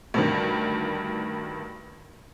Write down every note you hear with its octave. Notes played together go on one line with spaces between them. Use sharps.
D2 G2 D#3